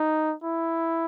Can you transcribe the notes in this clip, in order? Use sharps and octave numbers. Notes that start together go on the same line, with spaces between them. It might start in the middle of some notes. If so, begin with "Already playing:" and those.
Already playing: D#4
E4